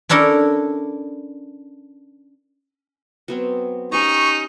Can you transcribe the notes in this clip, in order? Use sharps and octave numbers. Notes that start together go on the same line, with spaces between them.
C#4 D4 E4 A4 A#4
F#3 B3 C4
C#4 D#4 G4 A#5 C#6